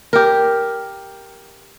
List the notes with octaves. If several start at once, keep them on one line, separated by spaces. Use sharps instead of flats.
G4 A#4